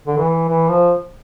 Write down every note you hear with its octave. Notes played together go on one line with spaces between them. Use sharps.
D3
E3
E3
F3